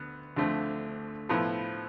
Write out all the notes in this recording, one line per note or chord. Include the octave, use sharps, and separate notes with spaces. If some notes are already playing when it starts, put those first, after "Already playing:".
Already playing: D2 B3
D2 D3 F3 A3 C4
A2 F3 B3 E4